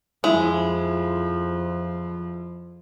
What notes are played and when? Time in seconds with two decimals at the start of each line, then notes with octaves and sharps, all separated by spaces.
0.24 F2 F3 G#3 E4